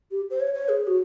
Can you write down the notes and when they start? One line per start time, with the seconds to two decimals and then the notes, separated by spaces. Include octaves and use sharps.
0.11 G4
0.31 C5
0.40 C#5
0.54 C#5
0.69 G#4
0.87 F#4